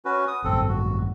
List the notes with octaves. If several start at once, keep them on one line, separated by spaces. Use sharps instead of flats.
C#4 F#4 B4
D#6
A1 G2 C4 A4
F#4